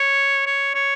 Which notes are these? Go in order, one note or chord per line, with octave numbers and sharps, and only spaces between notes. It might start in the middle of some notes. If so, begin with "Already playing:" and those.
Already playing: C#5
C#5
C#5